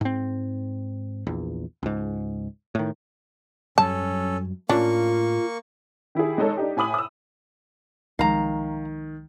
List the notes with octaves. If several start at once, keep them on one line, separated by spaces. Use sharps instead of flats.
G#2 C4
A#1 E2
C#2 G#2
A2 D#3
F#2 F#3 G3 C#4 A4 A5
A2 A#3 C#4 D4 F4 C#6
D#3 E4 G4 G#4
G#3 D#4 A4 C#5
D4 D#4 G4
A2 G#5 B5 D#6 F#7
D#6 E6
C2 D#3 F3 G#3 F5 A#5